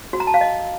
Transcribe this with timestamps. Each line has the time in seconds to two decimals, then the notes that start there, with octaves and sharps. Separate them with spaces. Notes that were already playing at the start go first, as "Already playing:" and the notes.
0.13 F#4
0.20 A#5
0.27 A5
0.34 F5
0.41 D#5